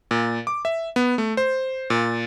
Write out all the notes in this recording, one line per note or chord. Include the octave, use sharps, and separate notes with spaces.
A#2
D6
E5
B3
A3
C5
A#2